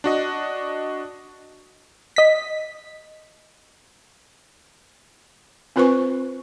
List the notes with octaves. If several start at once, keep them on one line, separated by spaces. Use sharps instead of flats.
D4 F#4 D#5
D#5 B6
C4 F4 B4 C5 G#5 C#6